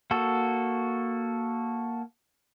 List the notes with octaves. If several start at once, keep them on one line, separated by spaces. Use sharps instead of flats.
A#3 F#4 A4